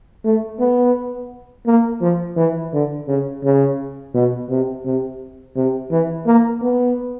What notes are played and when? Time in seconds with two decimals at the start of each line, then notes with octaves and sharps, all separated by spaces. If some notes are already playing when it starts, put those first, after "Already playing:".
0.25 A3
0.59 B3
1.66 A#3
2.01 F3
2.37 E3
2.73 D3
3.08 C#3
3.44 C#3
4.14 B2
4.49 C3
4.85 C3
5.56 C3
5.91 E3
6.27 A#3
6.62 B3